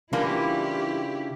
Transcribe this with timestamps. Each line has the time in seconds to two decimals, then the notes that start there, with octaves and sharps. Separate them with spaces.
0.13 C#3 E3 G3 A#3 D4 E4 F4 G4